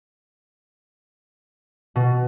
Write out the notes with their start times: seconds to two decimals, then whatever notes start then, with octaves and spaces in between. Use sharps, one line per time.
1.96 B2